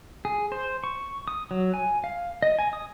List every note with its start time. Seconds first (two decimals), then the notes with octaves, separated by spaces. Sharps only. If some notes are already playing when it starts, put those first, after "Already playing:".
0.25 G#4
0.52 C5
0.84 C#6
1.28 D#6
1.51 F#3
1.74 G#5
2.04 F5
2.42 D#5
2.59 G#5
2.73 D#6